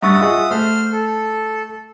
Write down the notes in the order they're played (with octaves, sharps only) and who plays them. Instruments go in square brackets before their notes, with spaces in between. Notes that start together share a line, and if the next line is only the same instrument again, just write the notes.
[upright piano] G2 C#6 A6 [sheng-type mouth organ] E5 F#5 D#6
[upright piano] F4 G#4 D#5
[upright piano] A3 [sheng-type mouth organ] C5 C6 F6
[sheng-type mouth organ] A4